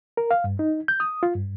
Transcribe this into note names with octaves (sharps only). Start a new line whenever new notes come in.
A#4
F5
G2
D#4
G6
D#6
F4
G2